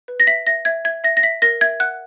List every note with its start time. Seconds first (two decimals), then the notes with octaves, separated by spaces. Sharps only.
0.08 B4
0.20 A#6
0.27 E5 B6
0.47 E5 A#6
0.65 E5 G#6
0.85 E5 G#6
1.04 E5 A#6
1.17 A#6
1.23 E5 B6
1.42 A#4 A#6
1.61 E5 G#6
1.80 F#5 F#6